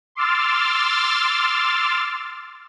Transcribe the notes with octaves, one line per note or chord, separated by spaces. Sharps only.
C6 D6 E6 F6 A6